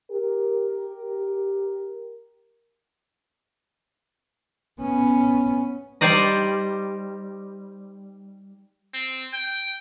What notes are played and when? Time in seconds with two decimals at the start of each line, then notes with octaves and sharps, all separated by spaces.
0.10 G4 A#4
4.80 B3 C#4
6.01 G3 D#4 C5 D5 D#5
8.94 C4
9.33 G5